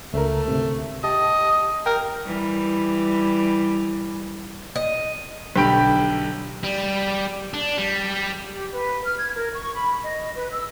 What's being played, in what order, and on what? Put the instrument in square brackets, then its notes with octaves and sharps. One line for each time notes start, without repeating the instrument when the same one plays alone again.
[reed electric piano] C#2 A#4 [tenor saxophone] A3
[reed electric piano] D2 G#2 C3
[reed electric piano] G4 A5 [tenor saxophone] D#5
[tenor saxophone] A#4 [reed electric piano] G5 F6
[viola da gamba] E3 G3
[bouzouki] D#5
[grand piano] B1 D3 G4 B5 D7
[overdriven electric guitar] G3
D4
G3
[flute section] G4
B4
F6
G#6
A#4
C#6
B5
D#5
B4
E6